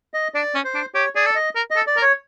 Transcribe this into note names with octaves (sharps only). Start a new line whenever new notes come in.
D#5
D4 D5
C#4
C5
D4
G4 C#5
G#4 D5
A4
D#5
A#4
D#5
A4
D5
A#4
C#5